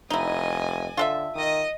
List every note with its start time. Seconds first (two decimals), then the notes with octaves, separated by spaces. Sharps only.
0.10 F1 D#4 E4 D#5 G#5
0.97 D3 F4 A4 E5
1.35 D#3 D#5 D#6